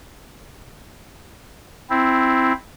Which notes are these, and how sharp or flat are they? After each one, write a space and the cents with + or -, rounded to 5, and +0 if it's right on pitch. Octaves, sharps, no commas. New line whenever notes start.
C4 +0 E4 +0